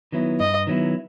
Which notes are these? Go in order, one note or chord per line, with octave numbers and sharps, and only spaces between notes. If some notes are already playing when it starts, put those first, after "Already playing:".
D#3 F#3 B3 E4
G2 D#5
D#3 F#3 B3 E4